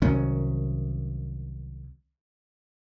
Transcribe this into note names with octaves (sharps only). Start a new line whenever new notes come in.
C2 D#3 F#3 C#4